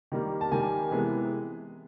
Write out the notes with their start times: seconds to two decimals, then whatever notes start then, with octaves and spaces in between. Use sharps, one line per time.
0.12 D#3 G3 A#3
0.41 A5
0.52 D#3 G3 A#3 G#5
0.91 C3 E3 G#3 B3